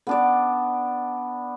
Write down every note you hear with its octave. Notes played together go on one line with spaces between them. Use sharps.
B3 D4 D5